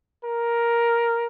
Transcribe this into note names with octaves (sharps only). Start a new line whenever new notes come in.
A#4